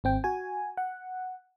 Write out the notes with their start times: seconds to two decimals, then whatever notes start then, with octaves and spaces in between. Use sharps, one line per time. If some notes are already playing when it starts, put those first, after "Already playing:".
0.04 G#1 C4 G5
0.24 F#4 G#5
0.77 F#5